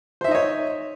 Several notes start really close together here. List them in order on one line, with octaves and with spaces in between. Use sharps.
C5 E5 D#4 D#5 C#5